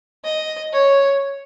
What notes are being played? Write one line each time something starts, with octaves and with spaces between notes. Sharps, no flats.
D#5
C#5